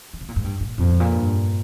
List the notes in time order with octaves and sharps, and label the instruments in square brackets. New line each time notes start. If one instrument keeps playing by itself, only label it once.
[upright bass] D3
C3
A#2
G#2
G2
A#2
[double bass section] F2 [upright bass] A#2
[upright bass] G#2
A#2
[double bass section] G2